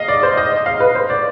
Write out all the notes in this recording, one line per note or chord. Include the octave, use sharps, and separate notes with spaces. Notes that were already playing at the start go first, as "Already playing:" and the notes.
Already playing: D#5 F5
D5
C5
D#5
F5
B4
C5
D5